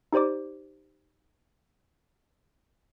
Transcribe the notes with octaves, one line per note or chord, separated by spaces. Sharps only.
D#4 G4 C5 D5 D6